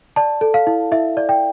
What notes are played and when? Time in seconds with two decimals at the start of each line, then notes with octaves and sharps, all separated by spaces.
0.16 D5 A5
0.41 A4
0.54 F5
0.67 E4
0.92 E4 E5
1.17 D5
1.29 G5